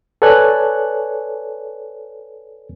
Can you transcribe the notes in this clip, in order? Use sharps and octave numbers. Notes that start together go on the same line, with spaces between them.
A4 B4 C#5 D5 G#5 F#6